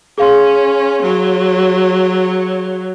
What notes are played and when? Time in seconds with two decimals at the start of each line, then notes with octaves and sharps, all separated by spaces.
0.18 C#4 G#4 F5 C6
1.02 F#3